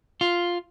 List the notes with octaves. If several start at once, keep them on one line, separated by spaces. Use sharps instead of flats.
F4